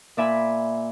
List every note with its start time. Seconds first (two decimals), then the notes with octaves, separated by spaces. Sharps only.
0.17 A#2 D5 E5 G#5 B5